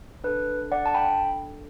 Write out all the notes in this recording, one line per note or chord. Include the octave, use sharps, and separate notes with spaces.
D4 A4 B4
D5 F#5
A5
G5 B5